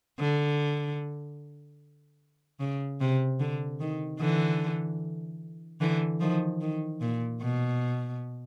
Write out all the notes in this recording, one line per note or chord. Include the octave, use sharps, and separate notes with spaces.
D3
C#3
C3
D3
D#3
D3 E3
D3 E3
D#3 F3
D#3
A#2
B2